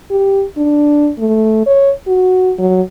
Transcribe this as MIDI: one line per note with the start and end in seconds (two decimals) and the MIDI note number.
0.11 0.44 67
0.57 1.10 62
1.18 1.62 57
1.66 1.91 73
2.07 2.53 66
2.59 2.82 54